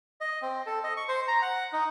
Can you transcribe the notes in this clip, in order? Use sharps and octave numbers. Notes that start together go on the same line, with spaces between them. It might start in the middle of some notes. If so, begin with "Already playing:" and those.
D#5
C4
A4
D#5
C#6
C5
A#5
F#5
D#4